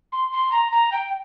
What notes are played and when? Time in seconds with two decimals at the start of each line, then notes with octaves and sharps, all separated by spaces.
0.12 C6
0.32 C6
0.52 A#5
0.72 A#5
0.92 G5